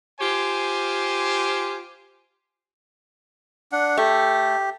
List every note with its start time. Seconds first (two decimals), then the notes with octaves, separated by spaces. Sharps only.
0.20 F4 G4 C5 G#5
3.72 D4 F#5
3.97 A3 G4